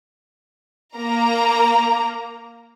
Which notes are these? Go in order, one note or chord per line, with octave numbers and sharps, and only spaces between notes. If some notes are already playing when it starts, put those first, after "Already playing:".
A#3 A#5